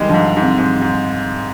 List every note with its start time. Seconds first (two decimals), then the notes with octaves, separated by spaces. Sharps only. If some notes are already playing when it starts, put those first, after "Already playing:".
Already playing: D#3 G3 G#3
0.09 G#2 D3 F3
0.37 G#2
0.42 C3
0.58 G#2 C3
0.81 G#2